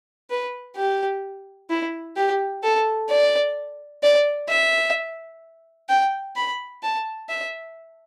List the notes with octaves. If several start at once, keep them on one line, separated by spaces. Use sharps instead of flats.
B4
G4
E4
G4
A4
D5
D5
E5
G5
B5
A5
E5